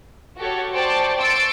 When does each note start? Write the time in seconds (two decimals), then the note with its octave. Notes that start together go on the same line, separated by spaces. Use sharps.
0.37 F#4 G4 A4 C#5
0.74 C5 D5 G5 A5 C6 C#6
1.18 C6 C#6 E6 A6 D7